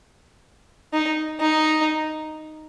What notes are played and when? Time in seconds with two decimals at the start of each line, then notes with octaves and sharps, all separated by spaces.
0.93 D#4
1.40 D#4